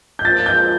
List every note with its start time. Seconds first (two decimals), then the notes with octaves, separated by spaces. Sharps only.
0.19 G6
0.24 F3 A#3 F4 A6
0.46 G6